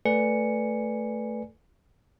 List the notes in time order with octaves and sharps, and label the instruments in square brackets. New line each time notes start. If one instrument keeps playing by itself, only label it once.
[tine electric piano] A3 A4 B4 D5 G#5 C#7